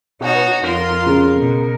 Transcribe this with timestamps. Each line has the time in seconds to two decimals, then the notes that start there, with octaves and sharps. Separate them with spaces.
0.21 B2 D#4 F#4 C#5
0.64 F2 F4 A#4 C6
1.06 C#3
1.36 B2